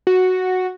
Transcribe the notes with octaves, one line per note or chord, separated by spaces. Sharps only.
F#4